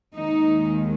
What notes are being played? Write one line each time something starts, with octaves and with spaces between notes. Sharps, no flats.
D#2 D#3 G#3 D#4